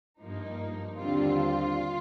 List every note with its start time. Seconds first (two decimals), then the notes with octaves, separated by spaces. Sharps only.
0.21 G2 F3 A#3 D#4
0.98 D#2 D3 G3 C4 F4